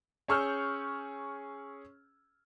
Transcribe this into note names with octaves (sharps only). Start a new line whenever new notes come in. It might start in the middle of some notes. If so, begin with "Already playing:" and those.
C#4 G#4 C#6 E6 F6 G6